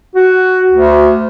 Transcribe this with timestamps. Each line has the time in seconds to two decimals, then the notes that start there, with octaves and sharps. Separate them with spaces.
0.15 F#4
0.71 D2